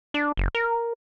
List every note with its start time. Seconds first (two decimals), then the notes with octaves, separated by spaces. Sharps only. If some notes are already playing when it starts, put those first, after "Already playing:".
0.14 D4
0.37 F#1
0.55 A#4